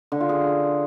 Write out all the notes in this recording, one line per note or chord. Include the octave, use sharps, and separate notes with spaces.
D3
F4
G#4